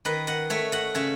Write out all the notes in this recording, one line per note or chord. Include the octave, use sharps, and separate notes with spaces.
D#3 B4 D#5
D#5 F#5
A3 C#5 E5
D#5 F#5
C#3 C#5 E5